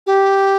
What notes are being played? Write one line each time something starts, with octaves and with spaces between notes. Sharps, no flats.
G4